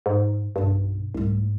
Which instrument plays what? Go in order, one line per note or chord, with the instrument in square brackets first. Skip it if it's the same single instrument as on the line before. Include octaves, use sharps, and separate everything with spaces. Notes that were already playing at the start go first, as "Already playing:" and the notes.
[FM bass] G#2
[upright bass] B1 B2 [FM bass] G2
[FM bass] C2 [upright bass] G#2 A3